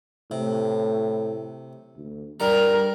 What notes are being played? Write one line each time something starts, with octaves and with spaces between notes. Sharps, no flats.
A2 C3
D2
G2 G3 A#4 A#5